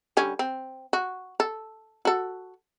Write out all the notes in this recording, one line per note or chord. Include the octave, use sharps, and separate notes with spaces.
D3 G3 C#4
C4
F#4
A4
F#4 A4